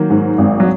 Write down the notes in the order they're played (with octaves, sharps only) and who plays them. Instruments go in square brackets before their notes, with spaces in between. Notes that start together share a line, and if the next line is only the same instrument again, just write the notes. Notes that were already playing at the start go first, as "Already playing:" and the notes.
Already playing: [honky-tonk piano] D#3 [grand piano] F#3 A#3
[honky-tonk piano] G#2
G#1
[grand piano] F#3